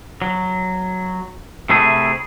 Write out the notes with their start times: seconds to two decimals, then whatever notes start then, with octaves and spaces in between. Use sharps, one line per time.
0.22 F#3
1.70 C3 A3 E4 G#4